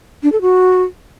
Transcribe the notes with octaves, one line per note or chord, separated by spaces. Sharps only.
D4
A4
F#4